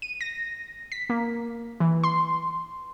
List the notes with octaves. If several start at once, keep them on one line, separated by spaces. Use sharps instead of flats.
D#7
A#6
B6
A#3
E3
C6